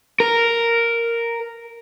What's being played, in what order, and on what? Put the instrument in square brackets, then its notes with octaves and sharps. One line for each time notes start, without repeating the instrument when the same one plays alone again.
[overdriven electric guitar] A#4